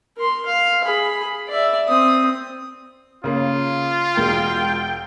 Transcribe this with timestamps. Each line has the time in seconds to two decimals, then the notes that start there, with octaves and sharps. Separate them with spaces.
0.17 A#4 C6
0.46 F5
0.84 G#4 B5
1.48 D5 E5
1.87 C4 D#6
3.24 C#3 A#3 C#4 F4
4.17 E1 G#3 A#4 G5